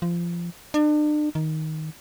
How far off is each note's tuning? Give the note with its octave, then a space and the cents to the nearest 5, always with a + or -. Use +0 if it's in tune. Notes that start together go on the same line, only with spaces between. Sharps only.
F3 -20
D4 +40
D#3 +10